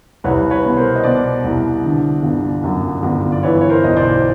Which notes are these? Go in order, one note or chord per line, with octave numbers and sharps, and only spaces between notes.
C2 B4 C#5
B4 C#5
B2
A#4 C5
D#5
B2 C5 D5
C2
D3
G1
F#2
G1
D5
E3 B4 C#5
C#5
A#4 C5
B1 D#5
C5 D5